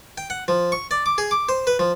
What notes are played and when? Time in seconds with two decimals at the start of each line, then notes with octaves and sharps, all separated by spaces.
0.18 G5
0.30 F#5
0.48 F3
0.72 C#6
0.91 D5
1.06 D6
1.18 G#4
1.31 D6
1.49 C5
1.67 B4
1.79 F3